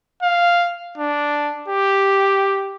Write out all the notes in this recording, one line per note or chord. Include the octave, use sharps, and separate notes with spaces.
F5
D4
G4